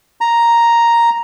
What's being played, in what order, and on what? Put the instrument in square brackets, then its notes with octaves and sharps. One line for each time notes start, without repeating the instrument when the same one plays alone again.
[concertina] A#5